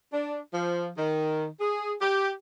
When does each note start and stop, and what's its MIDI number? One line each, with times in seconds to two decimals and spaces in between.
0.13 0.40 62
0.53 0.90 53
0.98 1.47 51
1.60 1.92 68
2.01 2.31 67